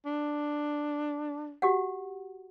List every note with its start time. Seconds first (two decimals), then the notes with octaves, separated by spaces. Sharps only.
0.06 D4
1.62 F#4 G4 F#5